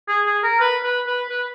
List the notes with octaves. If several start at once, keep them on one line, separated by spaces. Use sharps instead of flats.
G#4
G#4
A#4
B4
B4
B4
B4